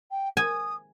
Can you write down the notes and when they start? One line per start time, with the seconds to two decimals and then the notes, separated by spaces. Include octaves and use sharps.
0.10 G5
0.37 G#5 D#6